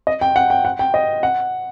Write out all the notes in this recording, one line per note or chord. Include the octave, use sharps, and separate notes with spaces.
D#5
G5
F#5
G5
F#5
G5
D#5
F#5